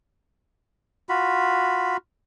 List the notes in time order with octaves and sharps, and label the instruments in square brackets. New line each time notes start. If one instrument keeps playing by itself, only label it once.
[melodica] F4 F#4 B5